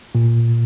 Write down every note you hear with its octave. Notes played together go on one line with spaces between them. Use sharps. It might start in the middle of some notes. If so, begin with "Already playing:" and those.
A#2